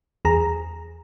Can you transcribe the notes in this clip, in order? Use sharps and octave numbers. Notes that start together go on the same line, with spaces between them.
E2 G#4 A#5